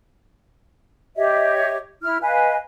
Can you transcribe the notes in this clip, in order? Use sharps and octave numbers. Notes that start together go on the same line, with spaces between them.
G4 C#5 D#5 E5
E4 F6
B4 D#5 F5 G#5